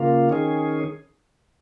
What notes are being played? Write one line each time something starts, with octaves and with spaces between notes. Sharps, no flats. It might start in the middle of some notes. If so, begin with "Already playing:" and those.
Already playing: C#3 A#3 F4
D#3 C#4 G#4